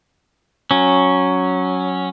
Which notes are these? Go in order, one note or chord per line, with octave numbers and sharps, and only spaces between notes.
F#3 C#4